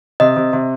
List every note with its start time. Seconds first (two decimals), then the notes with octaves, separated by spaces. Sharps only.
0.20 C3 D#5
0.36 C3
0.53 C3